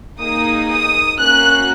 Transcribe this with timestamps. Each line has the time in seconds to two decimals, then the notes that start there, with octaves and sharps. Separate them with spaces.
0.19 A#3 D#4 G#4 D#6
0.68 D#6
1.18 A#3 C#4 F#4 F#6